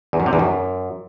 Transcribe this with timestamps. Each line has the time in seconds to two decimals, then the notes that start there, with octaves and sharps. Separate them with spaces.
0.13 E2
0.20 F#2
0.26 C3
0.33 E2
0.39 F#2